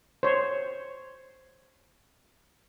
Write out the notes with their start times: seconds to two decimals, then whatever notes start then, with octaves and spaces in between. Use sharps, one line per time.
0.23 C5 C#5